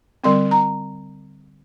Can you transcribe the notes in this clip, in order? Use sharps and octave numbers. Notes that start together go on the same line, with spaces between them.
D3 G3 C4 C6
A#5